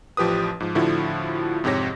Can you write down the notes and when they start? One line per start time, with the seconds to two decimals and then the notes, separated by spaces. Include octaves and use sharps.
0.17 A1 F3 G4 B4 D#6
0.60 G#2 F3
0.75 A2 D3 F3 E4 F#4
1.64 F2 G#2 C3 G4 C#5 A#6